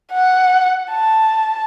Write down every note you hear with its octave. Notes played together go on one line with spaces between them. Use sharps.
F#5
A5